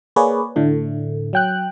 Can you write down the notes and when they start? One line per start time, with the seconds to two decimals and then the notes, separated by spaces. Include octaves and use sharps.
0.16 A#3 G#4 B4 C#5 D5
0.56 A2 D3 A3
1.33 F#3 G5 F#6